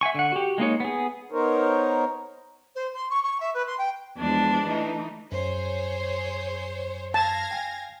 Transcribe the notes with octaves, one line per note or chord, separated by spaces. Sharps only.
E5 F#5 G#5 C#6
D3 F#5
F#4 G4
G#3 A#3 D#4 C#5
B3 G#4
B3 D#4 A#4 C5 C#5
C5
C6
C#6
C#6
E5
B4
C6
G5
E2 F3 G#3 D4
E3 A3 D#4
F#2 G#4 C5 C#5
F5 A5 G#6 A#6
G5 G#5